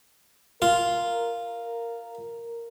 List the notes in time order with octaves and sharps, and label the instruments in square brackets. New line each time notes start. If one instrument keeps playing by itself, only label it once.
[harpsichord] F4 [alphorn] A#4